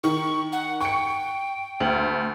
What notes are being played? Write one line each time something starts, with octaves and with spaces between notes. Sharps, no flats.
D#3 C#6
F#5
G5 C#6 C#7
D2